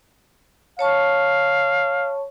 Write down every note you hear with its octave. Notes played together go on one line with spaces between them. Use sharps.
C#5 F5 A5 C#6